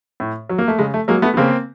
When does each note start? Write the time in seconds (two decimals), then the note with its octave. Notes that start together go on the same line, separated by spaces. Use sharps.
0.20 A2
0.49 F#3
0.58 A#3
0.68 A3
0.79 C#3 G#3
0.94 A3
1.08 F#3 G#3 A#3
1.22 A3 B3
1.34 B3
1.37 C#3 A#3 C4